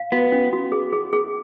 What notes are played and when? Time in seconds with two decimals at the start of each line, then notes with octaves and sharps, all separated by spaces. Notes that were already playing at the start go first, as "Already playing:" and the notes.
Already playing: F5
0.12 B3 F#4
0.32 C#4
0.53 F#4
0.72 G#4
0.93 G#4
1.13 G#4